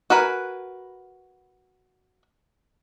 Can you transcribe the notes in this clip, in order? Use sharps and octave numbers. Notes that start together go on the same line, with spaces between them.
F#4 A#4 B4 G#5